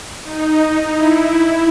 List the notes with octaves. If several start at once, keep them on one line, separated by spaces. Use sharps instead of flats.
D#4
E4